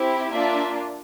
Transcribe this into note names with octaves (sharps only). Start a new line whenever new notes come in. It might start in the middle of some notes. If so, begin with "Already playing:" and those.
Already playing: C4 E4 G4
A#3 D4 F4 D5 E5